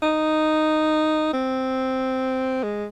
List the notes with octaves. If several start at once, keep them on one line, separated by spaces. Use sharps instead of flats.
D#4
C4
G#3